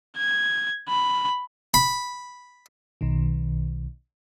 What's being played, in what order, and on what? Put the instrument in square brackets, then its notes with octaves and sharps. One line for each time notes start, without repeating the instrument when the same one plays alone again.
[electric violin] G#6
B5
[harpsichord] B5
[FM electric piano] B1 B2 D#3